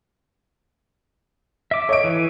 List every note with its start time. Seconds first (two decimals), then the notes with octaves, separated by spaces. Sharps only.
1.71 E5 D6
1.89 C#5 D#5 D7
2.04 E3